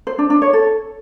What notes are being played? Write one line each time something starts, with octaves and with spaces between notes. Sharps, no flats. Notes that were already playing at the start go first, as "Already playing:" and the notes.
C5
D4
D4
C#5
A4